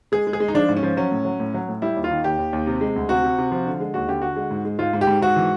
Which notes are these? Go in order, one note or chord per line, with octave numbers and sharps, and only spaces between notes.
G#3 G#4
G#3
G#4
G#3
D#4
F3 D4
G#2
C#4
F3
F#3 C#4
A2
F#3
A2
F#3
A2
G3 E4
D#2
F4
D#3
D#2 G4
D#2
D#2
C3
G#3
D2
C3 F#4
C3
C3
F3
D3
G#3
D#2 F#4
D3 G4
D3 F#4
G#3
G#2
G#3
G#2 F4
G#2
G4
G#2
G#2 F#4
E3